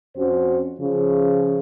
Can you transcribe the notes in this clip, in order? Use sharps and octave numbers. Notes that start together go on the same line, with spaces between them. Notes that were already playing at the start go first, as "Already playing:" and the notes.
F2 C#4 F#4 C5
C#3 F3